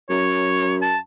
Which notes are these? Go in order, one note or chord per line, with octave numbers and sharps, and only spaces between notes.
F#2 C#5
A5